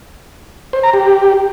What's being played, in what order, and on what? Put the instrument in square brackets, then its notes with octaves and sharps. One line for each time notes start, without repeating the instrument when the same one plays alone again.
[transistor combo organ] C5
A#5
G4